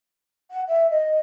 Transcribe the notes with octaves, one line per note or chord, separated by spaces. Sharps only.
F#5
E5
D#5